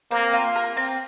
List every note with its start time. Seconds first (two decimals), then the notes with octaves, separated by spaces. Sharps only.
0.11 A#3 C4
0.33 F4
0.56 A#4
0.77 C4